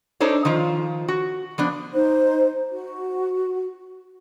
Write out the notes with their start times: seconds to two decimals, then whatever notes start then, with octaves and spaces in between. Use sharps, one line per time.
0.20 D4 D#4 A4 C5 C#5
0.45 D#3 F3 F4
1.08 F#4
1.58 F3 B3 D4
1.94 D#4 C5
2.72 F#4